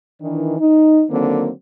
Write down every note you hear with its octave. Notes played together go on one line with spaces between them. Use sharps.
D#3 E3 D4
D#4
D3 D#3 F#3 A#3 C4